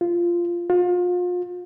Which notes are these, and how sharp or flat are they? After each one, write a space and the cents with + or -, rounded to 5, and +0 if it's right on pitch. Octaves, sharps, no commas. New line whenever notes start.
F4 -10
F4 +35